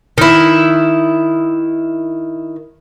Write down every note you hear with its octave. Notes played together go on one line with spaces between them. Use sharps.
D#3 E4